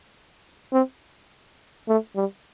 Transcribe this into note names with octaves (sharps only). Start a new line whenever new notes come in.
C4
A3
G3